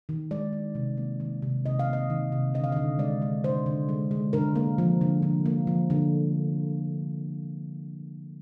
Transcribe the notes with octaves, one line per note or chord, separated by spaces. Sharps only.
D#3
G#3 D5
G#3
C3
A#3
D#3
C3
C3 D#5
F5
A#3
D#5
D#3
C3
D3 D#5
F5
D3 D#5
G#3 D5
G#3
D3 C5
D3
G#3
G#3
D3 A#4
A#3
F3
D3
D3
A#3
F3
D3